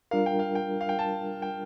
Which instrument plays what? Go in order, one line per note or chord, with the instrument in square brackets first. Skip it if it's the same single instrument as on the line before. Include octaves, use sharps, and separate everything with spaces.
[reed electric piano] G3 D4 F4 A#4 [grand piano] F5
[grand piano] G5
F5
G5
F5
G5
A5
G5